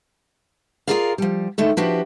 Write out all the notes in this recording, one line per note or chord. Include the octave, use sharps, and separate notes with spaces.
F4 G4 G#4 A#4 D5 F5
F3 G3
D3 D#3 A3 A4
F3 D4 E4 F#4 G4 B4